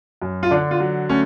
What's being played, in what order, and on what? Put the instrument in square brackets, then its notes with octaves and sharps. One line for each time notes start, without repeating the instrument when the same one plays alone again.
[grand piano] F#2
F4
D3 D4
F4
F#3
A3 C#4